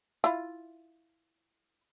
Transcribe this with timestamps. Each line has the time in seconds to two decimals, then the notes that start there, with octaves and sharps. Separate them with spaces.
0.24 E4 F4